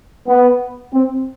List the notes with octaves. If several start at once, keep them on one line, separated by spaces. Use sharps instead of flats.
B3
C4